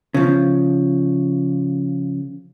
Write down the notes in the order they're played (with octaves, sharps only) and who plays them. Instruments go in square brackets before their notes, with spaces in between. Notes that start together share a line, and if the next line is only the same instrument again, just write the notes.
[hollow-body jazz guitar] C#3 F3